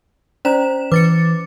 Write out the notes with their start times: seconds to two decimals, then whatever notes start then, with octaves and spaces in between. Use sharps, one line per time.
0.45 C#4 C5 D5 A#5 E7
0.92 E3 B4 D6 A6 C#7